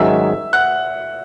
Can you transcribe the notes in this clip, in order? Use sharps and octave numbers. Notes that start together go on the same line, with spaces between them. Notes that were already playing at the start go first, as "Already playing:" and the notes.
Already playing: G#2 D#3 F#3 C#4 E5 E6
F#5 F#6